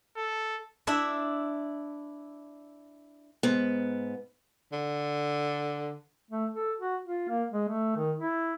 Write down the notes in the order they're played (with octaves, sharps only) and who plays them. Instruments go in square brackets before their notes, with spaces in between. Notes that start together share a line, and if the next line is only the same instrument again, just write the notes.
[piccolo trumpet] A4
[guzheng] D4 E4 E5
[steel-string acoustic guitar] G#2 B3
[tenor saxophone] D3
[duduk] A3
A4
F#4
F4
A#3
G#3
A3
D#3
E4